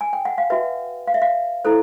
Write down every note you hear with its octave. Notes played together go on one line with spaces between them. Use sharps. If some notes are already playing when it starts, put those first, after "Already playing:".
G#5
G5
F#5
F5
F#4 B4 E5
F5
E5
F5
E4 A4 C5